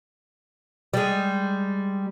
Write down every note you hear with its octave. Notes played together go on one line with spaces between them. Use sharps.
G3 G#3